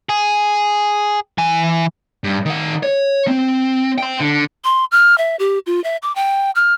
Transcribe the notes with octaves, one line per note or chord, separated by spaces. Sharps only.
G#4
E3 G#5
G2
D#3 F#5
C#5
C4
G5 C6
D3
C6
F6
E5
G4
F4
E5
D6
G5
F6